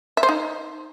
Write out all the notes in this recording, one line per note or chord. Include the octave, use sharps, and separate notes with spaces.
E5
C5
D#4